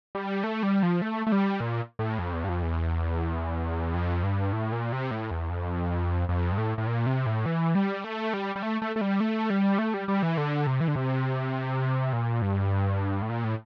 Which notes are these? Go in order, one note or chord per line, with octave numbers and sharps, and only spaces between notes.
G3
A3
G3
F3
A3
A3
G3
A#2
A2
F2
E2
G2
F2
E2
F2
G2
A2
A#2
C3
A2
E2
F2
F2
G2
A2
A2
A#2
C3
A2
E3
G3
A3
G3
G3
A3
A3
A3
G3
A3
G3
A3
G3
G3
E3
D3
C3
E3
D3
C3
A#2
G2
A2
A#2
A2